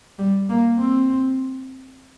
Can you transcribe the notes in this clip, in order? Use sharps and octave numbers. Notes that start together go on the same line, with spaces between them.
G3
A#3
C4